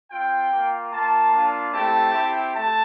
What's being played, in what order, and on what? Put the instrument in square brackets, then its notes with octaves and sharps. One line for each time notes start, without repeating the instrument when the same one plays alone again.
[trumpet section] C4 F4 G5
A#3 F4
A#3 F4 A5
A#3 D4 F4
A3 C4 E4 G4 A5
C4 E4 G4
A3 A5